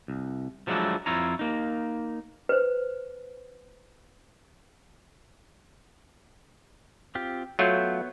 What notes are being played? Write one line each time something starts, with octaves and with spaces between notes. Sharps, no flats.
C2
F3 F#3 G#3 A3 D4 E4
F2 E4 F4 C#5 A#5
A#3 D#4
B4 C5
C4 F4 G4
F#3 A3 B3 F4 C#5 G6